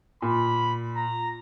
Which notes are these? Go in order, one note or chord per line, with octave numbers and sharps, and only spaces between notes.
A#2 B5
A#5